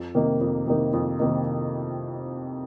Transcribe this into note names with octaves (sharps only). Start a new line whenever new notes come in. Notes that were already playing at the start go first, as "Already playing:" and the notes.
Already playing: F2
C3 D#3 A#3 D#4
F2
C3 D#3 A#3 D#4
F2
C3 D#3 A#3 D#4